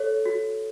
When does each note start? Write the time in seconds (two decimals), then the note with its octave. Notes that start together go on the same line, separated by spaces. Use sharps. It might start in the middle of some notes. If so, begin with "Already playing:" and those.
Already playing: A4 C#5
0.26 F#4